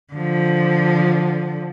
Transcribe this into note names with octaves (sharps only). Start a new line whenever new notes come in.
D3 F3